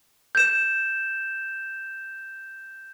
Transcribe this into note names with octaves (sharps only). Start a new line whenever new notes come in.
G6 E7